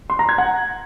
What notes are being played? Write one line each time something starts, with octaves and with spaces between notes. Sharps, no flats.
C6
A#5
G#6
F#5